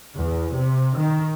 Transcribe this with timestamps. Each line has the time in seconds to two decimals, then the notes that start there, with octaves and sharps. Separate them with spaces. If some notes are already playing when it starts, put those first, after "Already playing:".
0.17 E2
0.55 C3
0.97 D#3